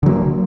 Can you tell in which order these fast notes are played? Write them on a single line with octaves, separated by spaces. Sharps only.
D3 F#3 A#3